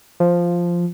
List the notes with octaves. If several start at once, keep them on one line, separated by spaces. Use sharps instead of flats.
F3